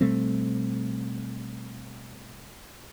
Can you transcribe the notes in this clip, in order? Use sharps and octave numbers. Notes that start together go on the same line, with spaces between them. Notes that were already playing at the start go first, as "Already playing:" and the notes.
B2 G3 A3 C4